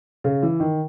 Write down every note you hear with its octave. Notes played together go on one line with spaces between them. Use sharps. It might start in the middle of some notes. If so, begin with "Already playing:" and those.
C#3
E3
D#3